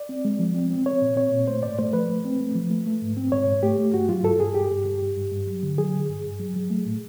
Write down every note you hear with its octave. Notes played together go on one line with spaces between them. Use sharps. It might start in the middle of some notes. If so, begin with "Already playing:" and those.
Already playing: D5
C4
G#3
F3
C4
C4
C4 C#5
A#2
C4 C#5
A#2
A3 C5
G#2 D5
A3 C5
F3 B4
A3
C4
A3
F3
A3
A3
G#2
C4
G#2 C#5
G#2
A3 G4
A3
G2 F#4
F#3 F4
G2 A4
G2 G#4
G2 G4
G2
G2
G2
G2
G2
F#3
D3
F#3 G#4
D3
G2
G2
F#3
F#3
A3
A2